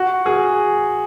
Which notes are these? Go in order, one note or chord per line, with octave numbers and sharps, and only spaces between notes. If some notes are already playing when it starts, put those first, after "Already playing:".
Already playing: F#4
G#4